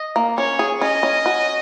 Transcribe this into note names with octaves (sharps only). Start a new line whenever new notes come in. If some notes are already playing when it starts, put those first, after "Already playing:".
Already playing: D#5
A#3
C#4 C#5
G#4
C#4 D#5
C#4
F#4